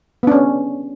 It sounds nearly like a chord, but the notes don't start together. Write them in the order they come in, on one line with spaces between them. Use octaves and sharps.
B3 D4 C#4